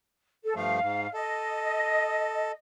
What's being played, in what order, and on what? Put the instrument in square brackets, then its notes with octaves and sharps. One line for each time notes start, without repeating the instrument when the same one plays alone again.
[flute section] A4
[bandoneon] G2 F3 A3 [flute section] F5
[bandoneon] G#2
[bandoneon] A4 [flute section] D#5